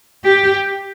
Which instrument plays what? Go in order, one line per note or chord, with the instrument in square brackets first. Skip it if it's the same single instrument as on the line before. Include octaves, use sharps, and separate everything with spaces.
[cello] G4